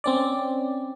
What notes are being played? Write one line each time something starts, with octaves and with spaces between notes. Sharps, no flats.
C4 C#4 D5